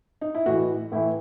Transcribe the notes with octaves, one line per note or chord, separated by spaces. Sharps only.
D#4
E4
A2 E3 F#4
A2 E3 E4